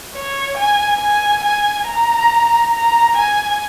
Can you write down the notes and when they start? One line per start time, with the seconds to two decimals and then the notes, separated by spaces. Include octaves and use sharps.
0.14 C#5
0.57 G#5
1.01 G#5
1.44 G#5
1.87 A#5
2.73 A#5
3.17 G#5